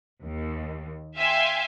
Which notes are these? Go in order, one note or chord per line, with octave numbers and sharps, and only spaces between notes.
D#2
E5 F5 G5 G#5 C6